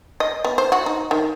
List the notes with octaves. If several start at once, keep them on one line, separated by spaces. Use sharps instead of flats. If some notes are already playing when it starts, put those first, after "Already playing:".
D#5
B3
C5
F#4
D#4
D#3